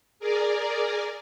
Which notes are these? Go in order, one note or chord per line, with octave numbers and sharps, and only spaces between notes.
G#4 A#4 D5